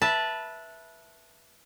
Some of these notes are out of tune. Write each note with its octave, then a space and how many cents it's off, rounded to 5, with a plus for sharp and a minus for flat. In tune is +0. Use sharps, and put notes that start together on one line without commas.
B4 -20 E5 +0 A5 +0